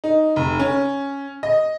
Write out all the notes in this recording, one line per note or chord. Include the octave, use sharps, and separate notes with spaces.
D#4
F1
C#4
D#5